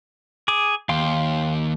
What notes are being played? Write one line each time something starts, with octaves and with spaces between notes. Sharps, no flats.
G#4 D6
D#2 F5 G5 C6